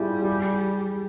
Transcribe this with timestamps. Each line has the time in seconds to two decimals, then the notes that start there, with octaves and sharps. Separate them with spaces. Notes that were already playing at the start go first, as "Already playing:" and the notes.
Already playing: G3 E4 F4 G#4
0.22 G4
0.27 G#4